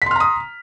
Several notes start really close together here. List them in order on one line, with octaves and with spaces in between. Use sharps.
B6 C6 F6 A#5 D#6